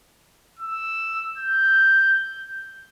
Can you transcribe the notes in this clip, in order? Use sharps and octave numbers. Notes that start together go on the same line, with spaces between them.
E6
G6